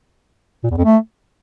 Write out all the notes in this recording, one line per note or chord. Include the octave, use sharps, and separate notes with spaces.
A#2
E2
F2
A3